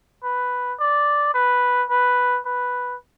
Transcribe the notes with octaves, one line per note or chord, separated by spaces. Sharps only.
B4
D5
B4
B4
B4